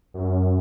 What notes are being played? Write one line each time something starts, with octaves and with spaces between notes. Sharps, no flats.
F#2